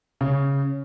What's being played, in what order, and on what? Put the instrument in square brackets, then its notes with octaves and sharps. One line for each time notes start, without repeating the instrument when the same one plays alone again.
[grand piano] C#3